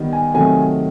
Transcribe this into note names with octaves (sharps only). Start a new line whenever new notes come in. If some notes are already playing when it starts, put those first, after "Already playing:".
Already playing: D#3 G3 B3
G#5
C3 D#3 F#3 A3 G#5